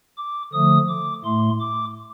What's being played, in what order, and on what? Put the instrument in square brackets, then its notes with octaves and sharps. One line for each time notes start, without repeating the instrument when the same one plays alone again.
[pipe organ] D6
D3 F3 A3 D#6
D6
A2 A3 C6
D6